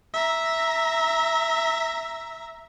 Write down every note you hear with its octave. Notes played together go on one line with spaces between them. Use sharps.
E5 A#5